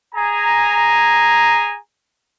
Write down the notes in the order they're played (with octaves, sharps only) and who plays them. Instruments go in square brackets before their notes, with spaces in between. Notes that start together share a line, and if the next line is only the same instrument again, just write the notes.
[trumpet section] G#4 G#5 A#5